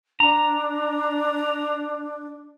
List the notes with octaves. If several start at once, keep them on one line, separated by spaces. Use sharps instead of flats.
D4 A#5